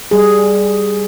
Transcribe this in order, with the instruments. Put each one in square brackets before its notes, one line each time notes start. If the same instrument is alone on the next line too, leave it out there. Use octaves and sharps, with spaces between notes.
[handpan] G3 G#4